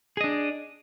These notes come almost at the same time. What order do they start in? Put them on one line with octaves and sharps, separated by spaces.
G#4 D#5 D4